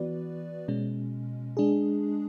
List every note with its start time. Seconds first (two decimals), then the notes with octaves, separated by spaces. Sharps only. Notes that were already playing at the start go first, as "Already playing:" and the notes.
Already playing: E3 B3 F#4 B4 D5
0.68 B2 G#3 C#4
1.57 G#3 D4 G#4